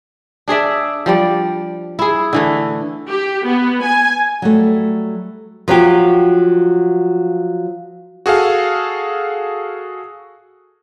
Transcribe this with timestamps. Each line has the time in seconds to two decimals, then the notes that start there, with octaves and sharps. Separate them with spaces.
0.48 D4 G#4 D5 E5
1.06 F3 G3 D5
1.99 E4 G#4
2.33 D3 E3 A3
3.08 G4
3.46 B3
3.82 G#5
4.42 F#3 G3 A3
5.68 F3 F#3 F4 G4
8.26 F#4 G#4 A4 F5